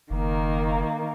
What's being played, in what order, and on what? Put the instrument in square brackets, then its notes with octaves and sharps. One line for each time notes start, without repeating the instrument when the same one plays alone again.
[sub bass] F#1 [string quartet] D#3 A#3